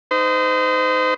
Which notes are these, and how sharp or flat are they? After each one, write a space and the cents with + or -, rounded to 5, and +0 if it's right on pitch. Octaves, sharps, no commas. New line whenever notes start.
D#4 +0 C5 -35